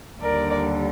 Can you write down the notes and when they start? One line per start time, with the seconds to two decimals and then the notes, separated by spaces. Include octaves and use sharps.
0.20 D#2 D3 G3 A#4 D5